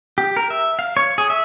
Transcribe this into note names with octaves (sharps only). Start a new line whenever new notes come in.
G4
A#4
E5
F5
C#5
G#4
E5